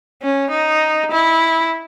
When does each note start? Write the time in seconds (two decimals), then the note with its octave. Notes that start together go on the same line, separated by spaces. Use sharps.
0.22 C#4
0.51 D#4
1.11 E4